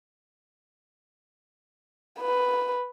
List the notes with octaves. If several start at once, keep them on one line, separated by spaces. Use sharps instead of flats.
B4